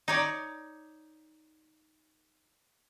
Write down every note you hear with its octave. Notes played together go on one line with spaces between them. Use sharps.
D#4 C#5 D5